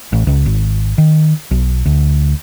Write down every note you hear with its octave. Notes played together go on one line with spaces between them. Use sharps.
A1
C#2
G#1
D#3
B1
D2